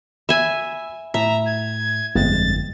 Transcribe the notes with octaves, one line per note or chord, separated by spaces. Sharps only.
E5 G#5 B5 E6
A2 E5 A#5
G#6
G1 F2 G#3 A6